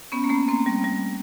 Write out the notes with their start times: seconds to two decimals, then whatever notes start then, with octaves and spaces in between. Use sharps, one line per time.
0.12 B3 C#4
0.24 A#3
0.29 A3 B3
0.48 A#3 C4
0.66 G3
0.84 G3